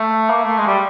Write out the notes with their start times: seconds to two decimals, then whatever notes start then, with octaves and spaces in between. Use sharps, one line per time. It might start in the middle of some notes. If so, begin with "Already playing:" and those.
Already playing: A3
0.30 A#3
0.44 A3
0.58 G#3
0.67 G3